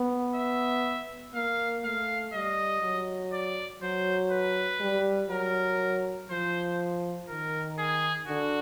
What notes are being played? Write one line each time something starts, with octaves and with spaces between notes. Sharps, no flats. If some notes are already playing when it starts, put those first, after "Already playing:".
Already playing: B3
E5
A#3 F5
A3 F5
G3 D#5
F#3
D5
F#3 C5
B4
G3
F#3 A#4
F3 C5
D#3 A#4
G#4
D3 F#4